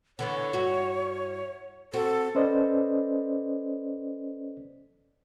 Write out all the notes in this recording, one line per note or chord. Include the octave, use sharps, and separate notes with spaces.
D3 E3 B3 C#5
G2 E4 F#4
C4 F#4 A4
C#4 A4 B4 C5 D5 D#5